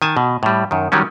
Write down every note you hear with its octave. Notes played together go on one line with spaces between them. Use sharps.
D#3 G#5 A5
B2
A2 G3
F#2 D#3
D#3 F#3 G3 C#4